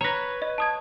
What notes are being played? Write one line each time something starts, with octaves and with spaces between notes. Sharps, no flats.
B4 C#5 A#5 A#6
D#5
A5 D#6 G#6